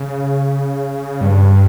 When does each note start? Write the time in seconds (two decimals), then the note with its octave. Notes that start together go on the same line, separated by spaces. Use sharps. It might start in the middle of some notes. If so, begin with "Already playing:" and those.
Already playing: C#3
1.21 G2